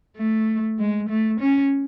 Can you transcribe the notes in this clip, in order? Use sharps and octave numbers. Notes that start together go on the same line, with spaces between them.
A3
G#3
A3
C#4